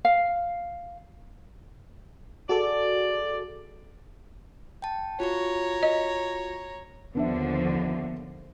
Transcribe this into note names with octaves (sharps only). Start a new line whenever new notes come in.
F5
F#4 G#4 A4 D5
G5 A5
F4 F#4 C#5 A#5 C#6
D#5
D#2 D3 F3 B3 D4 E5